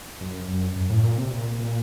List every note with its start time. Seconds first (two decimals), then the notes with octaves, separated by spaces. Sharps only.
0.21 F#2
0.48 F#2
0.76 F#2
0.90 A2
1.03 A#2
1.17 C3
1.31 A#2
1.59 A#2